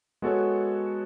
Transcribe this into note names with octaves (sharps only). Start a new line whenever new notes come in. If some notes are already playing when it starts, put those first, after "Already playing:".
G#3 B3 F#4 A4 C#5